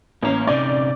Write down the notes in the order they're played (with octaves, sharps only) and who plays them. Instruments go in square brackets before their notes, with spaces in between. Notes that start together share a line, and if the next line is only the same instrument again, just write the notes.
[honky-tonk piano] A1 C#4 [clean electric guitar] A#3 A#5
[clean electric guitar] C3 C#4 D#4 [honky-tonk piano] D5